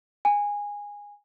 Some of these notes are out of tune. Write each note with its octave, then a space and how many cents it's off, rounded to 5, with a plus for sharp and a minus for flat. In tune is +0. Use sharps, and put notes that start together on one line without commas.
G#5 -15